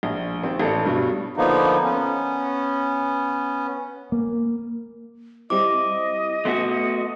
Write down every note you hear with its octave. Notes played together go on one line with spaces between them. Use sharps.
A#1
G#1 C4
A1 A4 D5
G2 B2
D3 F3 A#3 B3 D#4
B3 C#4
A#3
G3 C4 E4 D#5 D6
A3 B3 F#4 C6 D#6